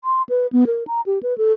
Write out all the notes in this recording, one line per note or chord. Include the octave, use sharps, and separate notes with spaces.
C6
B4
B3
A#4
A#5
G4
B4
A4